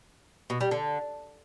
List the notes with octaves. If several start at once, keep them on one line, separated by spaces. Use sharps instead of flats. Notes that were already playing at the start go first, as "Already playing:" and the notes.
B2
G3
D3